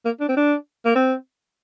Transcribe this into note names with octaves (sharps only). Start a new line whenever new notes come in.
A#3
D4
C4
D4
A#3
C4